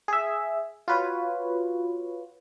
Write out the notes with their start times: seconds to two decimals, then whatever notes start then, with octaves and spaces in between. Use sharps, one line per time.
0.08 G#4 E5
0.88 F4 F#4 B4 C#5